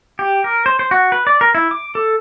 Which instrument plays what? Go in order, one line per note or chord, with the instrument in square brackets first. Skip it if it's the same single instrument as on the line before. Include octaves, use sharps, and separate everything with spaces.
[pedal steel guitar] G4
A#4
C5
C5
F#4
B4
D5
A#4
E4
D6
A4